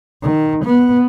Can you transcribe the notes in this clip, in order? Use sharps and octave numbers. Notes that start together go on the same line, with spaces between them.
D#3
B3